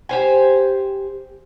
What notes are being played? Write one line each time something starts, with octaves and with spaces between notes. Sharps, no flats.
G4 C5 G#5